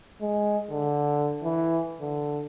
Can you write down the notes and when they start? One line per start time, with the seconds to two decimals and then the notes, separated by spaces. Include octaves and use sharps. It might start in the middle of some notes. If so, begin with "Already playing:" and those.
0.21 G#3
0.70 D3
1.43 E3
2.01 D3